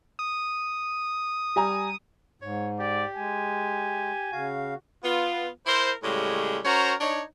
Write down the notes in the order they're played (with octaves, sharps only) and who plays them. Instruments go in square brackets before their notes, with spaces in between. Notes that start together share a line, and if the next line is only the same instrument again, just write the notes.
[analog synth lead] D#6
[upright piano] G3 G#5 A#5
[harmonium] G#2 [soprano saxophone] C#5
[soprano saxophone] G4 [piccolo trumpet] D5
[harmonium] G#3 [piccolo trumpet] G#5
[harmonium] C#3 F5 [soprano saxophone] F#4
[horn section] B3 F4
E4 A#4 C5
A2 C#3 G3 G#3
C#4 F#4 A#4 C5 A#5
D4 D#4 C#5